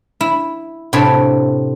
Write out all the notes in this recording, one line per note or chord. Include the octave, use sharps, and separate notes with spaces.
E4
A2 C3 D4 C#5 D5 B5